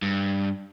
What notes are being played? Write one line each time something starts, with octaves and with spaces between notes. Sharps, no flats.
G2